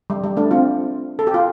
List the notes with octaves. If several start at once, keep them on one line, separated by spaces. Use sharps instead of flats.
G3
G3
A3 D4
C4 F4
A4
G4
F4